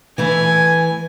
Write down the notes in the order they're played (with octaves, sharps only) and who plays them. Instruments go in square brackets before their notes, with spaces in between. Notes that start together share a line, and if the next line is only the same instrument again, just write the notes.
[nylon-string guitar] E3 A3 E4 [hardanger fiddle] G#5